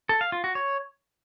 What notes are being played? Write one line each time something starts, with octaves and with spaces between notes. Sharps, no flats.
A4
F5
F4
F#4
C#5